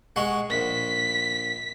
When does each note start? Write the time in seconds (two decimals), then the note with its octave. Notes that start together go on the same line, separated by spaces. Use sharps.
0.16 G#3 F#5 C#6
0.50 A#1 B6